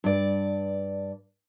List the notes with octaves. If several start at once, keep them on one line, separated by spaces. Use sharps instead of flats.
G2 D5